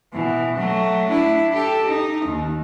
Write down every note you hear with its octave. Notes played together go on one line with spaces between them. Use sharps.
B2 E3
F#3 A3
D4 E4
G4 A4
D#4
D#2